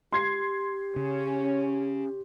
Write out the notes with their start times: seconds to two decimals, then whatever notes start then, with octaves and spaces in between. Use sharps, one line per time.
0.12 G4 C6 G#6 C7
0.96 C#3 C#4